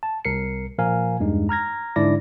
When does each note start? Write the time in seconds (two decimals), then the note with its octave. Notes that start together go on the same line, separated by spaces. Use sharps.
0.03 A5
0.25 C2 A#4 C7 C#7
0.78 A#2 F3 A#4 F5 G#5
1.19 E2 G2 G#3 D#4
1.49 A#5 F6 G#6 A#6
1.96 G#2 D3 D4 E4 D5 A#6